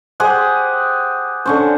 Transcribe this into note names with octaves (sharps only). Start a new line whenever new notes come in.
G4 G#4 C5 F#5
D3 C#4 C5